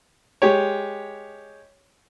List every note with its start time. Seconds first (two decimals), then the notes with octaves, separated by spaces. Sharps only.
0.42 G#3 G4 C#5